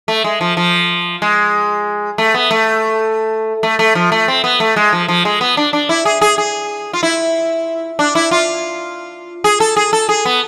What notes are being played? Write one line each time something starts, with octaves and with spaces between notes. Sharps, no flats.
A3
G#3
F3
F3
G#3
A3
B3
A3
A3
A3
F3
A3
C4
B3
A3
G#3
F3
F3
G#3
B3
D4
D4
E4
G#4
G#4
G#4
F4
E4
D4
E4
F4
G#4
A4
G#4
A4
G#4
B3